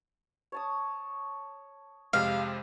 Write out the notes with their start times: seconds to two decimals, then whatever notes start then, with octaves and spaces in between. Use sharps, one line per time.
0.52 C#5 A5 D#6
2.13 F2 C3 G#3 F5